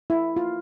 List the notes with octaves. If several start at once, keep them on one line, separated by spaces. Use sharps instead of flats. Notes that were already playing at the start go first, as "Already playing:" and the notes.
E4
F4